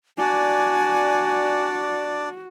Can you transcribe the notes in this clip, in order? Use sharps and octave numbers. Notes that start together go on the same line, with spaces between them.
D4 F#4 D5 G#5